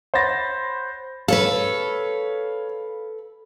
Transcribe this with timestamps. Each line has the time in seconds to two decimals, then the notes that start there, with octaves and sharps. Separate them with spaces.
0.14 C5 C#5 F#5 B5 A6 A#6
1.28 A4 B4 C#5 F5